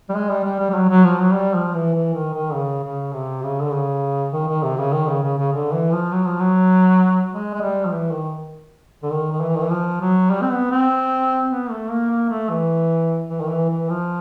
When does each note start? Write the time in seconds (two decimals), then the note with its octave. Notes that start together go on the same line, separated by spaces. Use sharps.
0.09 G3
0.14 G#3
0.29 G3
0.44 G3
0.59 G3
0.70 G3
0.74 F#3
0.89 F#3
1.04 F3
1.19 F#3
1.34 G3
1.54 F3
1.74 E3
1.94 E3
2.14 D#3
2.33 D#3
2.53 C#3
2.83 C#3
3.13 C3
3.43 C#3
3.62 D3
3.73 C#3
4.33 D#3
4.47 D#3
4.63 C3
4.77 C#3
4.93 D#3
5.07 C#3
5.23 C#3
5.38 C#3
5.52 D3
5.72 E3
5.92 F3
6.12 F#3
6.26 F3
6.39 F#3
7.32 G#3
7.54 G#3
7.61 G3
7.85 F3
7.91 E3
8.11 D#3
9.03 D3
9.11 D#3
9.31 D#3
9.41 E3
9.56 D#3
9.63 E3
9.70 F3
10.01 F#3
10.31 G3
10.42 C4
10.51 B3
10.71 C4
11.50 B3
11.70 A3
11.90 A#3
12.10 A#3
12.30 A3
12.50 E3
13.30 E3
13.40 D#3
13.49 E3
13.69 E3
13.89 F3